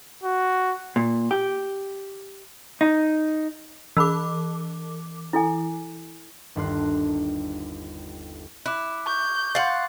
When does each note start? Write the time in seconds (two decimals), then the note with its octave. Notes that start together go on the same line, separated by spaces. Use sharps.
0.23 F#4
0.96 A#2
1.31 G4
2.81 D#4
3.97 E3 G#4 B5 D6 E6
5.33 E4 A4 G#5
6.56 G1 D#2 D4 A4 C6 F#6
8.66 E4 D6 F#6
9.07 C#6 G6
9.55 F5 F#5 C6 A6